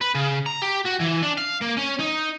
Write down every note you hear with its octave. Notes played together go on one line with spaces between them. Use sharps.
B4
C#3
A#5
G4
F#4
E3
D4
F5
A#3
C#4
D#4